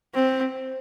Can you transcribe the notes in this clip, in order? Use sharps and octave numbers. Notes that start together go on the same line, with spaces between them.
C4